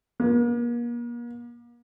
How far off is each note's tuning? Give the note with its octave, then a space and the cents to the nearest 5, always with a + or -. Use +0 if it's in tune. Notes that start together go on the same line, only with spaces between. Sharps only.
A#3 +40